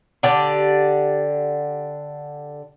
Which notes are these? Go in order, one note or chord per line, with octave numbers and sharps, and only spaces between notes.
D3 G4 D5